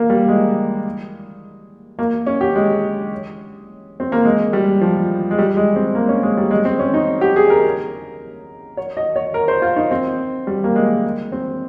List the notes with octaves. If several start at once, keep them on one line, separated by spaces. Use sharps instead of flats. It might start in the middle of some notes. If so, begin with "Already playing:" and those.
Already playing: A#3
G3
G#3
A#3
C#4
G4
G#3
C4
A#3
G#3
G3
F3
G#3
G3
G#3
C4
A#3
C#4
G#3
G3
G#3
C4
C#4
D#4
G4
G#4
A#4
C#5
D#5
C#5
A#4
C5
F4
D#4
C4
G3
A#3
G#3
C4